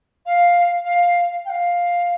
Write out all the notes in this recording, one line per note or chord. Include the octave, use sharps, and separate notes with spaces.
F5
F5
G5
F5